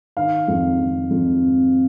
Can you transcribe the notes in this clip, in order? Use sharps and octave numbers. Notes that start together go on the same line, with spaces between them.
D#3 F5
F2
F2
F2
C4